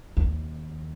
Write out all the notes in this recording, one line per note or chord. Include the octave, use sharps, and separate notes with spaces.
D#2